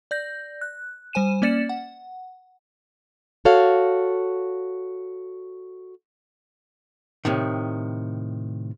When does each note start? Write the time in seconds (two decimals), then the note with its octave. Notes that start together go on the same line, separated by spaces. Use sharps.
0.11 D5 G6 A#6
0.61 F#6
1.13 G3 C5 G#5 D#7 E7
1.42 A#3 C#4 D5 A6 C#7 E7
1.69 F#5
3.45 F#4 A4 C#5 F5
7.25 A2 C3 D#3